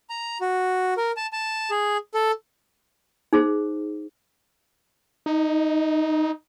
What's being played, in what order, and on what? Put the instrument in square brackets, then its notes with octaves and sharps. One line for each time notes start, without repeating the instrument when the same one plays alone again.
[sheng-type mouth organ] A#5
F#4
A#4
A5
A5
G#4
A4
[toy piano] D#4 G#4 C5
[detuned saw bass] D#4